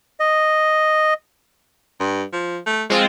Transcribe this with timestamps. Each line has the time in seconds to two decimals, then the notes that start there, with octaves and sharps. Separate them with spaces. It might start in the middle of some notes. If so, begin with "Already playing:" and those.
0.20 D#5
2.00 G2
2.33 F3
2.67 A3
2.90 F3 G#3 C4 F4